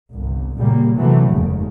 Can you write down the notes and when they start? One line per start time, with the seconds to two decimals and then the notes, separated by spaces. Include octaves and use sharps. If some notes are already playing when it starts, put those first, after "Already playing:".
0.15 G1 C2
0.58 F#2 A#2 C#3 G3 A#3
0.99 F#2 C3 E3 F#3 A3
1.34 F1 D#2 G#2 C#3